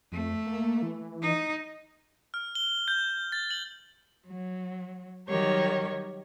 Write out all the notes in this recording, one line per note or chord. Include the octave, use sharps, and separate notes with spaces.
F2 A3
A#3
E3
D#4
F6
G7
G6
A6
F#7
F#3
D#3 F#3 G3 G4 A#4 C#5